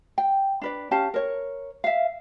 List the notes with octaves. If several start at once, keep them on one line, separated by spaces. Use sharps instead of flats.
G5
D4 B4 D5
C#4 G4 F5 A5
A#4 C#5
E5 F5